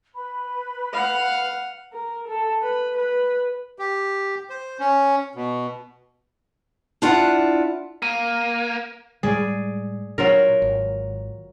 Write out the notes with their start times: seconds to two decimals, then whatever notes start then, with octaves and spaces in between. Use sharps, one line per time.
0.14 B4 B5
0.93 F5 F#5
1.93 A#4
2.28 A4
2.63 B4
2.98 B4
3.79 G4
4.50 C5
4.80 C#4
5.35 B2
7.02 D4 E4 F4 D5 F#5
8.02 A#3 D#7
9.23 A2 G3 G#3 G#4 D5
10.18 A#2 F#3 D4 F4 A#4
10.62 G#1